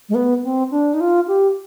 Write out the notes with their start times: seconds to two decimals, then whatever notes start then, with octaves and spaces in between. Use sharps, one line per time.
0.09 G#3
0.15 B3
0.44 C4
0.71 D4
0.94 D#4
1.01 F4
1.28 G4